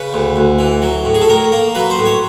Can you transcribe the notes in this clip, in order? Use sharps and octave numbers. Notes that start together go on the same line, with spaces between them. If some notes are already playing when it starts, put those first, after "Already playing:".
Already playing: C#3 B4
D2
D2
E3
F#3
A2
G#4
A4
A2 A#4
A#3
F#3 B4
C5
A2
C#5